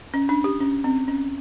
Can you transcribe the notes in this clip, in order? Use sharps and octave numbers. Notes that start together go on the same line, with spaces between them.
C#4
D4
G4
C#4
C4
C#4